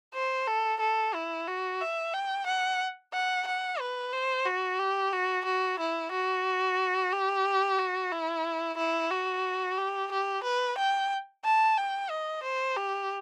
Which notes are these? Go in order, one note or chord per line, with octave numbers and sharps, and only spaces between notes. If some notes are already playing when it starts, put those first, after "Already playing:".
C5
A4
A4
E4
F#4
E5
G5
F#5
F#5
F#5
B4
C5
F#4
G4
F#4
F#4
E4
F#4
G4
F#4
E4
E4
F#4
G4
G4
B4
G5
A5
G5
D#5
C5
G4